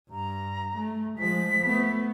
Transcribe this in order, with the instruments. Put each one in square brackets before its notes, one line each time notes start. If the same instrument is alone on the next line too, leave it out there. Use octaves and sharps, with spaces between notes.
[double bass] G2 [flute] A#5
[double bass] A3
[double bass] F3 G#3 [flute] B6
[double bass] A3 B3